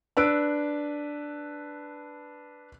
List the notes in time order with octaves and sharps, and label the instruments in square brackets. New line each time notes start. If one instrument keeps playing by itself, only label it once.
[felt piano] D4 B4 E6 D7